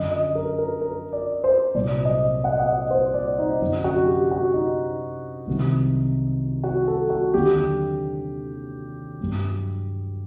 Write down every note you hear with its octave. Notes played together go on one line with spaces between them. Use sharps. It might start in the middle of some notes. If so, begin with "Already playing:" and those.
Already playing: F#2 D3 F#3 D#5
D#5
A#4
A#4
A#4
D5
C5
C2 A#2 F#3 D5
D#5
F#5
D#5
F#5
D#5
C5
D5
D#4
F#2 D3 F#3 D#4
F#4
G4
F#4
D#4
C2 C3 D#3 F#3
F#4
A4
F#4
D#2 D3 F#3 G4
G2 F#3